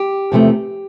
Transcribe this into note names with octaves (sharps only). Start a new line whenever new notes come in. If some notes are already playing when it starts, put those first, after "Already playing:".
Already playing: G4
E2 C3 F3 A3